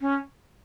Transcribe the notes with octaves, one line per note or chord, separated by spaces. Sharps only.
C#4